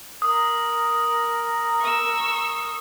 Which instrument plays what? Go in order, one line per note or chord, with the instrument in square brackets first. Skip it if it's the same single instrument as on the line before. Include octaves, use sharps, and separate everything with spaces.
[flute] A#4 [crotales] D#6
[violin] C#6 E6